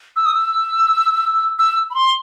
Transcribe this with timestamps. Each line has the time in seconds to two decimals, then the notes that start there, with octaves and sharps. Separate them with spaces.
0.16 E6
0.26 D#6
0.34 E6
1.59 E6
1.91 B5
1.95 C6